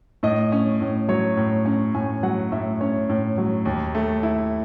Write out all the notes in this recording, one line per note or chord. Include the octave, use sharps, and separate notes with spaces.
A2 D#5
C#4
A2
F#3 C#5
A2
C#4
A2 G#5
F#3 F#5
A2 E5
C#4 C#5
A2
F#3
D#2
A3
E4